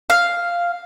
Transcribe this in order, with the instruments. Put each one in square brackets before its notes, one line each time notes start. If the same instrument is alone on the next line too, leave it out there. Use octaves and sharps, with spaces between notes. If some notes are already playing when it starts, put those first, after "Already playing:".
[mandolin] F5